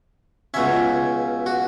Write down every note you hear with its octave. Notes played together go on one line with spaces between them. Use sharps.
C#2 B2 F#3 C#4 E5
F#4